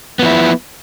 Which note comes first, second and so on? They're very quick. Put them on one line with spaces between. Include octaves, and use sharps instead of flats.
B3 F3 E4